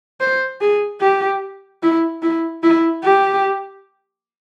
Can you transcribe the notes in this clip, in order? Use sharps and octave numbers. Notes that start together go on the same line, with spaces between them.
C5
G#4
G4
E4
E4
E4
G4